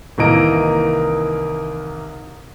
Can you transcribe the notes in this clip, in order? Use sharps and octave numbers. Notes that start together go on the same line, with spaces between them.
C2 D#3 E3 A#3 D#5 D7